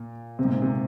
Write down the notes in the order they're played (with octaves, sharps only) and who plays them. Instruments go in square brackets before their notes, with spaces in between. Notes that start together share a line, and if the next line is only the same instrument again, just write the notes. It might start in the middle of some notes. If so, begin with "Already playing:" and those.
Already playing: [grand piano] A#2
C3
G#2
A#2
C3